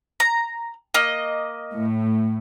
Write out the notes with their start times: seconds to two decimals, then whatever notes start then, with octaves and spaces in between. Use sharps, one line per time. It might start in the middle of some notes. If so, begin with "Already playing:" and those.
0.20 A#5
0.94 A#3 D#5
1.72 A2